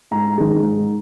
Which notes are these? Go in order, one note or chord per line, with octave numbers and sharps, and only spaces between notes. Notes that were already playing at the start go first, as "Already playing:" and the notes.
G#2 A#5
D#3 G#3
G#2